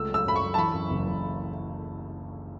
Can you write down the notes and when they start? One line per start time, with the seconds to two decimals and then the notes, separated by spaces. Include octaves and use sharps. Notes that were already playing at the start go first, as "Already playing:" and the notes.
Already playing: C#2 A3 E6
0.08 F#3
0.14 E6
0.25 F#2 B5
0.36 C#6
0.41 F#2
0.54 A5
0.58 E3 B5
0.73 F#2
0.90 F#1
1.07 F#1